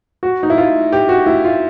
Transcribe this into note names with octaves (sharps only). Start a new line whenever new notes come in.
F#4
D#4
E4
F4
G4
F#4
E4
F4